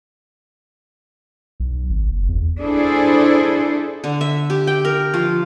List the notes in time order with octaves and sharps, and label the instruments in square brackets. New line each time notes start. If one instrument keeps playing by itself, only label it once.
[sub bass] B1
G#1
F#1
E2
[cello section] D4 E4 G#4 A4 C5
[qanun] D3
E5
G4
G5
A#4
F3